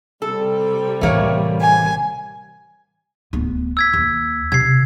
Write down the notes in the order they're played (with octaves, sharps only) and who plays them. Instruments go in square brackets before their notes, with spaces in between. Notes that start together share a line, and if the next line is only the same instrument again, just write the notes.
[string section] C3 G3 [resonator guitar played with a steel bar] A4
[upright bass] A1 E3 [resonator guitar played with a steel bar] A3 A#3 C#5
[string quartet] G#5
[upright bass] D1 B3
[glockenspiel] E6 G#6 B6
[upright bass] D#2
[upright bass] C3 [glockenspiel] G#6 C7